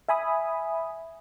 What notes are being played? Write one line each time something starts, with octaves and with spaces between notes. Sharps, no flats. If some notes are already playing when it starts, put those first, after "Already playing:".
E5 G#5 B5 D#6